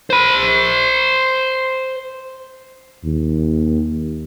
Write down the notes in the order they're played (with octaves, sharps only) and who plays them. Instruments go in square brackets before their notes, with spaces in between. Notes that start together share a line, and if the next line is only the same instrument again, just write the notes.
[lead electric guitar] C5 B5
[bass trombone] D#2